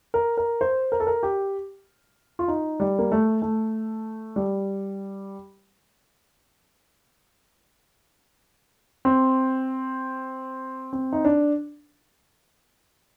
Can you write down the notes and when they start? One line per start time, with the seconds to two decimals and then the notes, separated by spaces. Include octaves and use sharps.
0.14 A#4
0.37 A#4
0.61 C5
0.92 A#4
1.00 A4
1.07 A#4
1.23 G4
2.39 F4
2.48 D#4
2.80 G3
2.99 A#3
3.12 A3
3.42 A3
4.36 G3
9.05 C4
10.93 C4
11.13 D#4
11.25 D4